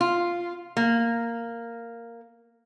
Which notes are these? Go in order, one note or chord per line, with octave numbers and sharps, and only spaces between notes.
F4
A#3